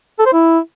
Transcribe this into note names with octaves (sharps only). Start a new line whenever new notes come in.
A4
C5
E4